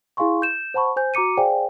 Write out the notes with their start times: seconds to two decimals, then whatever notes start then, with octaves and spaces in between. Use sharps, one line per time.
0.17 E4 G#4 F5 G#5 C6 C#6
0.42 G6 E7
0.74 C5 F#5 A5 B5 C#6
0.97 C5 G#5 G6
1.14 F#4 A#5 D6 C#7 D#7
1.37 G#4 C5 D5 F5 G5 G#5